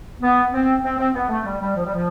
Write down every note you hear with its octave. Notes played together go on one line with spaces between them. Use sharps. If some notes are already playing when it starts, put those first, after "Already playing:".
B3
C4
C4
C4
B3
A3
G3
G3
F3
G3
F3